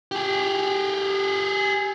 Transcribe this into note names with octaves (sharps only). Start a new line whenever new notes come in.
G4 G#4